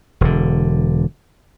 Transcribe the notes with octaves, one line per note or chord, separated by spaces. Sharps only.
E1 D3